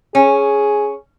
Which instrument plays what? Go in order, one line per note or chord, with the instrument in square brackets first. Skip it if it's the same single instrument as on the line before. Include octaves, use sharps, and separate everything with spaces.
[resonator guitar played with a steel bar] C#4 [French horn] G#4